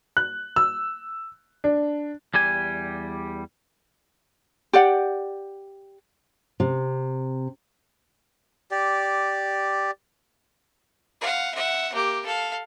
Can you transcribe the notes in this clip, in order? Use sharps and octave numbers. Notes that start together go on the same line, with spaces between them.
F#6
E6
D4
E2 G3 G4 G#5
G4 D5 F#5
C3
G4 D5
F5 F#5
E5 F#5
A#3 G4
A4 F5